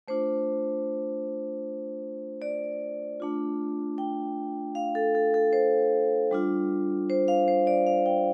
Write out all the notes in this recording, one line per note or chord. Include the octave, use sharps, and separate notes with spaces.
A3 D4 F4 C5
D5
A3 D4 F4
G5
F5
A4
A4
A4
C5
G3 D4 F4
C5
F5
C5
D5
F5
G5